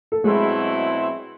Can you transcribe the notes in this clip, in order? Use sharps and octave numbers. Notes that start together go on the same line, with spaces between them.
A4
B2 F#3 G#3 A3 C4 E4 G#4